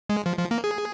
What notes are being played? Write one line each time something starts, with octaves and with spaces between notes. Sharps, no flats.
G#3
F3
F3
A#3
G#4